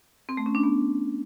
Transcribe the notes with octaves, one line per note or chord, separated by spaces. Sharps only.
C4
A3
C#4
D4
B3